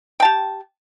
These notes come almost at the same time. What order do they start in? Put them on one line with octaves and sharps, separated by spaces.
G5 A5 G4